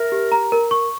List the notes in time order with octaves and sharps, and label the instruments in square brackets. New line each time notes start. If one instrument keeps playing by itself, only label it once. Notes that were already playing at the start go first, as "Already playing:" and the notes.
Already playing: [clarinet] A#4 [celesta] E5
[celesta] G4
A#5
A#4
C#6